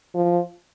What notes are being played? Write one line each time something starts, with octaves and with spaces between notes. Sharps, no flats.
F3